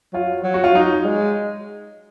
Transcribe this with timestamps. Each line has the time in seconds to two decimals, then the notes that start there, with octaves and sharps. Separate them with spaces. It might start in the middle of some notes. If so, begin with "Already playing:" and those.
0.13 F#3 F4
0.44 F#3
0.54 F#4
0.64 F4
0.75 F#3 D#4
1.05 G#3